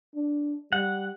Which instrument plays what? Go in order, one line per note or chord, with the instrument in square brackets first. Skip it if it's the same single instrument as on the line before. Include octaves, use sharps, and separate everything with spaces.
[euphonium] D4
[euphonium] G3 [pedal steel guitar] F#5